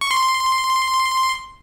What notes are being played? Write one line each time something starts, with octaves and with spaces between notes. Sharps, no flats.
C#6
C6